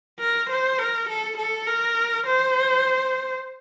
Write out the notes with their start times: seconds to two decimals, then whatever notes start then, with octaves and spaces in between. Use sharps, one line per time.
0.20 A#4
0.50 C5
0.79 A#4
1.09 A4
1.37 A4
1.67 A#4
2.26 C5